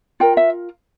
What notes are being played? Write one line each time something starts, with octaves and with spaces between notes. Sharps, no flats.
F4 A#4 G5
E5